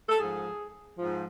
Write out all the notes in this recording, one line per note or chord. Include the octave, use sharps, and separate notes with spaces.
A4
G#2 F3 G#4
G#2 F3